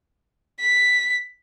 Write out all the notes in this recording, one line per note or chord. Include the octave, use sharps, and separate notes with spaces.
B6